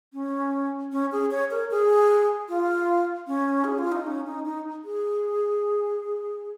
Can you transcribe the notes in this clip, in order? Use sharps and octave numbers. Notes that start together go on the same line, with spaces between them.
C#4
C#4
G#4
C#5
A#4
G#4
F4
C#4
G#4
F4
D#4
C#4
D#4
D#4
G#4